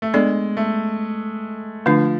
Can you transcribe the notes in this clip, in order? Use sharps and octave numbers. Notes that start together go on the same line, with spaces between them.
A3
G#3 B3 D4 A4 D5
A3
D3 F3 A3 D4